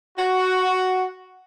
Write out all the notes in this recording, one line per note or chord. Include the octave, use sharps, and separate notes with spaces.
F#4